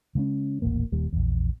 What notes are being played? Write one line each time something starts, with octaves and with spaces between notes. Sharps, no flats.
C#3 G#3 C4 C#4
D#1 A1 A#3
D#1 D#2 G3
A#1 E2